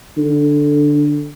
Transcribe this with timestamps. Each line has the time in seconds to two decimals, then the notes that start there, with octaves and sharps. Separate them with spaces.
0.17 D3